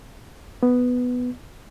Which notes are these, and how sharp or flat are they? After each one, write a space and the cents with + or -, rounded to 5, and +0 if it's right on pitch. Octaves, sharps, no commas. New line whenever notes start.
B3 +5